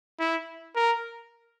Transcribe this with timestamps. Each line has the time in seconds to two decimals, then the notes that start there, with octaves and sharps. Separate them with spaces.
0.19 E4
0.76 A#4